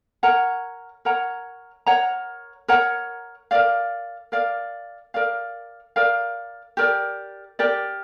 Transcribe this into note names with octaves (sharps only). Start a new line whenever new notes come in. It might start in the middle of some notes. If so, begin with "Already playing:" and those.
A#4 C#5 F#5 A#5
A#4 C#5 F#5 A#5
A#4 C#5 F#5 A#5
A#4 C#5 F#5 A#5
A#4 D5 F5
A#4 D5 F5
A#4 D5 F5
A#4 D5 F5
G4 A#4 D5
G4 A#4 D5